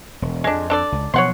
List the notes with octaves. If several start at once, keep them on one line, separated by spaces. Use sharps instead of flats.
E1
F2 G#3 D4
D4 A4 D5
C#2
B2 F3 F#3 C#5 F#5 C6